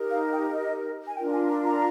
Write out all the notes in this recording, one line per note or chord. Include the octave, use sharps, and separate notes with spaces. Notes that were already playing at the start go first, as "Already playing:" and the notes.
Already playing: D#4 G4 A#4
F5
G5
D#5
G#5
D4 F4 A#4 G5
G#5
A#5
A#5